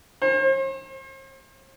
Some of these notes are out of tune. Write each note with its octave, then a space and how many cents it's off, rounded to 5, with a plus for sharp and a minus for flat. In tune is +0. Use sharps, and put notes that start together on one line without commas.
C5 +45